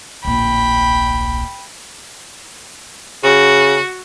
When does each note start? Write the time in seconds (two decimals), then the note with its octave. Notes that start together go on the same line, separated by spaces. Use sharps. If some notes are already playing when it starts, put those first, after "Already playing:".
0.25 D1 A#1 G5 B5
3.24 C#3 F#4